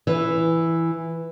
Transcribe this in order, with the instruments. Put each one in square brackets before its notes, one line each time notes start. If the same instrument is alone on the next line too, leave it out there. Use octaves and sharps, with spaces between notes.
[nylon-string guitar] E3